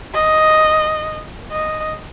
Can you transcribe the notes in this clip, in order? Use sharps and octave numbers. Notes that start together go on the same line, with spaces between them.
D#5
D#5